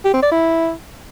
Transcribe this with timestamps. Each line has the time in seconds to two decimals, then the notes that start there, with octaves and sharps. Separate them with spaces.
0.05 G4
0.14 C4
0.23 D5
0.32 E4